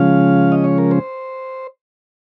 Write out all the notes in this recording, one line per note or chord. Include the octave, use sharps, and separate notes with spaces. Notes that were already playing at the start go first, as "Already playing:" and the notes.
Already playing: C#3 F3 G#3 C#4 F5
D#5
C#5
A#4
C5